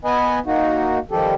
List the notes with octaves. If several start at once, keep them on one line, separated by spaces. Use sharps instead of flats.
B3 B4 D#5 G#5
A#3 D#4 F#4
D#3 F3 G3 G4 A4